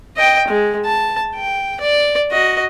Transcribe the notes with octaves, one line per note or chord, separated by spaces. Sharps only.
D#5 G5
G#3
A5
G5
D5
F#4 D#5